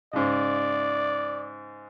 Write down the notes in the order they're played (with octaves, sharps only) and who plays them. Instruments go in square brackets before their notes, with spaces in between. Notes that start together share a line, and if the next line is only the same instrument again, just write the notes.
[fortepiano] G#2 C#3 [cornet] D5